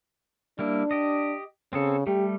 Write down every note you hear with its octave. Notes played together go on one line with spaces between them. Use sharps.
G3 A#3 D4 E4
G4 D#5
C#3 C4 G#4 A4
G3 A3 G4